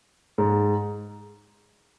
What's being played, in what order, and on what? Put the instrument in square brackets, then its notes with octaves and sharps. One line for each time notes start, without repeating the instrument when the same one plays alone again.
[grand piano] G#2